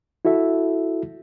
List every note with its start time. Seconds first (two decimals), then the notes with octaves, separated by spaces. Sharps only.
0.25 E4 F#4 A4 E5